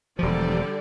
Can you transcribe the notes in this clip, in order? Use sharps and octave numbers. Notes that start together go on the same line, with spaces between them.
E1 D3 F3 G3 D5